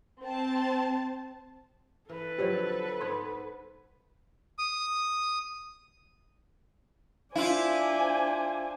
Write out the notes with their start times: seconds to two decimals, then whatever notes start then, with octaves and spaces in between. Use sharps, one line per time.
0.23 C4 A5
2.09 E3 A4 B4
2.39 D3 F3 F#3 G4 C5 C#5
3.01 G#2 B3 C6 G#6
4.58 D#6
7.35 D4 E4 F4 C5 F5 G#5